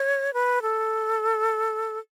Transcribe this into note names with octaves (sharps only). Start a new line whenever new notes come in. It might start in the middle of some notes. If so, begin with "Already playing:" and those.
Already playing: C#5
B4
A4